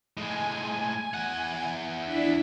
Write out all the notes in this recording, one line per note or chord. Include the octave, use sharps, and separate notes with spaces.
A2 G#3 G#5
E2 F#5
D4 E4 B6